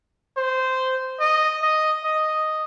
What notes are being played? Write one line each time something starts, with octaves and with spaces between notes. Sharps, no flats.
C5
D#5
D#5
D#5